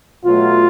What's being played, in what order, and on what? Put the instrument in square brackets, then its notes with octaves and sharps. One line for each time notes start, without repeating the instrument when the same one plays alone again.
[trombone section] B2 F#3 A3 F4